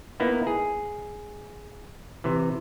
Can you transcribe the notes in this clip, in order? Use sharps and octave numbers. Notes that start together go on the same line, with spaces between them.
A#3 B3 D#4 E4
G#4
C3 E3